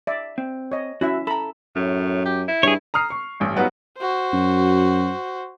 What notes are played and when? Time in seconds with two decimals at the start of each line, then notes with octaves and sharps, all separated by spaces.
0.07 D5 E5
0.38 C4
0.72 C#5 D#5
1.01 C#4 E4 F#4 E5
1.27 A4 A#5 B5
1.76 F#2 A2
2.25 G4
2.48 E4
2.63 G2 G#4 C#5
2.94 A#5 D#6 F6 C7
3.10 C#6
3.40 A1 G2
3.56 F#3 G3 B3 D#4 F4 F#4
3.98 F#4 C5
4.33 F#2